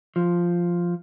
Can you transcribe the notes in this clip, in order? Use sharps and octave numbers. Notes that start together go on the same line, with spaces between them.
F3